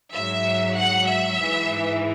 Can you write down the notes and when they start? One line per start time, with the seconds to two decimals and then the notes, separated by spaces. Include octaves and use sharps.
0.13 G#2 F#3 E5
0.76 F#5
1.07 E5
1.39 G#2 E3